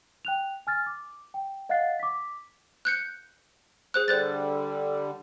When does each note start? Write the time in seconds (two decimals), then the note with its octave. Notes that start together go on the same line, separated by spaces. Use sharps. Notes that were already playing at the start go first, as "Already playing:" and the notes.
0.25 G5 F#6 F7
0.67 G#5 F6 A6
0.86 D6
1.34 G5
1.69 D#5 F5 F#5 F#6 A6 C7
1.99 D6 B6
2.85 F#6 G6 C#7
3.94 G#4 C5 F#6
4.08 D3 G3 C5 F#6 A6